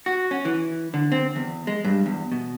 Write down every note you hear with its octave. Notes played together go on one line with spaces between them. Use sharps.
F#4
C#4
E3
D3
C4
E2
G#3
G2
E2
B2